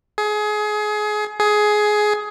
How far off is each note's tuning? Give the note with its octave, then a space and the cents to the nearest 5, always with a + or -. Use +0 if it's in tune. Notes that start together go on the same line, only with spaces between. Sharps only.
G#4 +25
G#4 +15